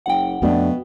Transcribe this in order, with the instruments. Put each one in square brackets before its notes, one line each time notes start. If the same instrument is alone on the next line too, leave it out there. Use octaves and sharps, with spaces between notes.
[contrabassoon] F#1 [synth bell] F#5 G5
[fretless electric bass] F2 A3 D4 [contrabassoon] B2